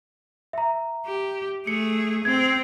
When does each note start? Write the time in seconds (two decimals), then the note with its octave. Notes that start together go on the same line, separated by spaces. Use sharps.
0.53 E5 A#5
1.06 G4
1.67 A3 G#4 C#7
2.25 C4 G#6